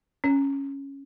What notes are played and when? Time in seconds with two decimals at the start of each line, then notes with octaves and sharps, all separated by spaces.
0.24 C#4